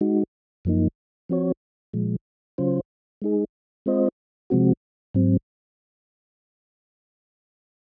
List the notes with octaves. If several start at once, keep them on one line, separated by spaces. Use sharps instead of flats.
G#3 D#4 F#4
F#2 F3 A#3 D#4
F3 C4 F#4 C#5
A#2 F3 G#3
C#3 F#3 C#4 F4 C5
G#3 D#4 G#4
G#3 C4 F4 C5 D#5
C3 F3 G#3 C4 F#4
G#2 F#3 C4